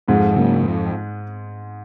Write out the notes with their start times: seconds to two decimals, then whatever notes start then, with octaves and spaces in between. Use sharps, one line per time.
0.08 F2 G#2 G#3
0.36 C#3 F#3 A#3
0.63 F2